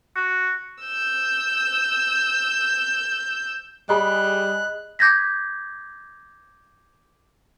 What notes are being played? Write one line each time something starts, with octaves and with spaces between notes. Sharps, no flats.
F#4
E6 G6
G3 G#4 D#5 B5 F#6
D6 G6 G#6 A#6 B6